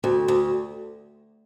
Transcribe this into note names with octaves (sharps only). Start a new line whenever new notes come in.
D2
D2